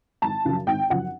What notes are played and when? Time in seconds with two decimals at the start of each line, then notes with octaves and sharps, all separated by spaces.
0.22 G#1 A5
0.45 F#2 C#3 F3
0.67 G#1 G5
0.90 F#2 C#3 F3 F#5